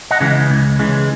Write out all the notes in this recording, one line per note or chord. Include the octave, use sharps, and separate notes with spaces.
D#5 F#5
C#3 E3 G#3
C#2
C#3 E3 G#3